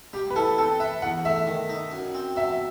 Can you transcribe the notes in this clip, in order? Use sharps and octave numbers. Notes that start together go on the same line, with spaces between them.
G3 G4
B4
E4 A4
C4 A4
B4 E5
E2 F#5
A3 E5
D#3
D#4
F#2
C4
F#3 E5